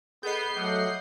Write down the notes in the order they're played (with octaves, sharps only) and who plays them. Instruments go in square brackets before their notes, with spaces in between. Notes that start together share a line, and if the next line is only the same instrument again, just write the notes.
[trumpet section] B3 [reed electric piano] G#4 A4 D#5 [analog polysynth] G6 C7
[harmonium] F#3 A3 [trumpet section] D#5 F#5 [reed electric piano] D6 F6